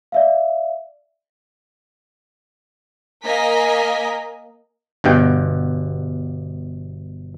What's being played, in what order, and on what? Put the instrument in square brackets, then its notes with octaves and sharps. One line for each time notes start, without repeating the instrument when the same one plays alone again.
[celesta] D5 E5 F5
[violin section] A#3 A#4 D#5 G#5 A#5 B6
[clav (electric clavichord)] G1 G2 B2 G5